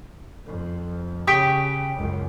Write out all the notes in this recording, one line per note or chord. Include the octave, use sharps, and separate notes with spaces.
F2
C#3 G4 G5 C#6 D#6 B6 D7
C#2 F#2